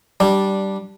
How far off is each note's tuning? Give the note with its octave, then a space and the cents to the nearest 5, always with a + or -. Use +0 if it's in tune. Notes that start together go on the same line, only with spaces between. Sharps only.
G3 -10 D4 +0